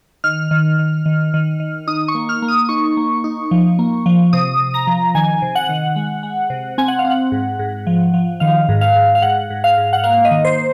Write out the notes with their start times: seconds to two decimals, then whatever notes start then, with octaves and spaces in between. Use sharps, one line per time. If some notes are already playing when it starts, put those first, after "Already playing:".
0.24 D#3 F6
0.51 D#3
0.79 D#3
1.06 D#3
1.34 D#3
1.60 D#3
1.87 D#4 D#6
2.08 C#6
2.15 A#3
2.29 F6
2.42 A#3
2.48 D#6
2.69 D#4 C#6
2.97 A#3
3.24 D#4
3.51 F3
3.79 A#3
4.06 F3
4.33 C3 D#6
4.59 C3
4.74 A#5
4.87 F3
5.15 D#3 G#5
5.42 C3
5.55 F#5
5.69 D#3
5.96 G#3
6.23 G#3
6.50 C3
6.78 C4 G#5
6.88 F#5
6.99 F5
7.05 C4
7.10 F#5
7.32 G#2
7.59 G#2
7.87 F3
8.14 F3
8.40 D#3 F5
8.69 G#2
8.81 F5
8.96 G#2
9.15 F5
9.22 G#2 F#5
9.50 G#2
9.64 F5
9.78 G#2
9.93 F#5
10.04 A#3 F5
10.25 D#5
10.31 D#3
10.45 C5